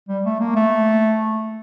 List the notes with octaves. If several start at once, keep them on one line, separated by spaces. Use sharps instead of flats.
G3
A3
A#3
A3